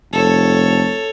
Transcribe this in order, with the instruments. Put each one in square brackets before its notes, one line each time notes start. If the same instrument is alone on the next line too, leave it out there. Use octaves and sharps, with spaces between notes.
[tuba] F1 [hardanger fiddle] A4 C#5